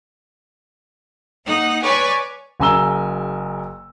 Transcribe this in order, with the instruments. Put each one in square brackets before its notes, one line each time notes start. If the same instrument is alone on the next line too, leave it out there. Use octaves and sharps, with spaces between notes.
[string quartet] A#3 D#4 F#5
B4 C#5 D5 G#5 C#6
[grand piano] F#1 C#3 G#5 A#5 E6 G7